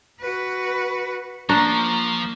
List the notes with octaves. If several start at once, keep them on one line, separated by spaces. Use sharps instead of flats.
F#4 B4
F3 A#3 D4 A#5 C#6